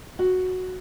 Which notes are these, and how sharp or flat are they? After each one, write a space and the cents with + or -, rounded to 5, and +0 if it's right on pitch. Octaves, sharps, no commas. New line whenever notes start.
F#4 -5